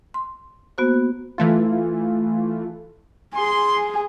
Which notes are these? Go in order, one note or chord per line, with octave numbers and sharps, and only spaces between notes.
C6
A#3 B3 F#4 C5
E3 A3 F4
G#4 C6